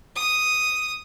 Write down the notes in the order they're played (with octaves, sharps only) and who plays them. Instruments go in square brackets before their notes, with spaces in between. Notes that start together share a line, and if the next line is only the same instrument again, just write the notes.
[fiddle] D#6